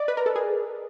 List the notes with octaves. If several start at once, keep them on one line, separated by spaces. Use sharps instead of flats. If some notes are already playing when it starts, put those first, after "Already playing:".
Already playing: D5 D#5
B4
A#4
A4
G#4